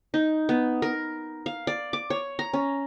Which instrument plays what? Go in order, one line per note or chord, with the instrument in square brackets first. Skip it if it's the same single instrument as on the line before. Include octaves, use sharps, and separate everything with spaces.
[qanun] D#4
B3
A#4
F5
D5
D6
C#5
A#5
C#4